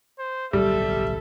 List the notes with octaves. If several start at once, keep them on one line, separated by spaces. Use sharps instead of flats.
C5
D1 B1 G3 A4 E5